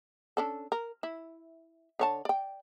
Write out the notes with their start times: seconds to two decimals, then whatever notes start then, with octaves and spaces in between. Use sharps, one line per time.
0.37 C#4 D4 A4
0.72 A#4
1.03 E4
1.99 D3 C#5 A5
2.25 D5 G5